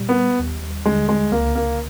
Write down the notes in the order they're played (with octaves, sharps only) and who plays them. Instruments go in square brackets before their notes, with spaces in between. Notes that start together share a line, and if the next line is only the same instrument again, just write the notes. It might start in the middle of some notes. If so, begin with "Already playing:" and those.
Already playing: [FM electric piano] A#2 G3
[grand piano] B3
[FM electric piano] D#2
[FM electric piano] D3 [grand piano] G#3
[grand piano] G#3
[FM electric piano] C#2 [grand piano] A#3
[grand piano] A#3